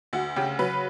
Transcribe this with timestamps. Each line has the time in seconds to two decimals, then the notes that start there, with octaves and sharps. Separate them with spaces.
0.13 D2 F#4
0.36 C#3 G4
0.59 F#3 B4